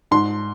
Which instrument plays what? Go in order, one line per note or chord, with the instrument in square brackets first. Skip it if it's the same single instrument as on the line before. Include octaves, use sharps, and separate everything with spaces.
[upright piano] G#2 C6